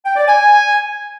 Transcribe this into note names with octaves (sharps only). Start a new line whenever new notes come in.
G5
D5
G#5